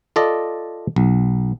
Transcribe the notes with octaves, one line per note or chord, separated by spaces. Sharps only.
F4 A4 D5 D#5
B1